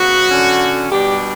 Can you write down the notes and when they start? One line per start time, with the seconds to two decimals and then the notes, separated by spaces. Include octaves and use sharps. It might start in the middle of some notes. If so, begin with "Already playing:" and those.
Already playing: C#3 F#3 B3 F#4
0.29 D3 F#3 C#4
0.89 B2 G3 D4 G4